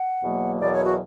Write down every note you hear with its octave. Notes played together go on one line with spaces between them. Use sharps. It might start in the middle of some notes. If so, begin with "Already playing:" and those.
Already playing: F#5
E2 B2 F#3 A#3
E2 B2 F#3 A#3 D5
C#5
F#4